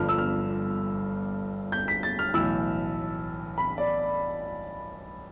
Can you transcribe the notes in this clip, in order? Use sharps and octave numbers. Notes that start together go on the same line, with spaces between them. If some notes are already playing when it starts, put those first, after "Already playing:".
Already playing: G1 G2 D3 F3 F6
E6
F6
G6
B6
A6
F6
B1 A2 E3 E6
B5
D5